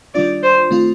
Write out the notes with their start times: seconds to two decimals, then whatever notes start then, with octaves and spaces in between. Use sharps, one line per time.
0.14 D#3 G3 D4 F4 D5
0.43 C5
0.71 D#3 A3 C4 F4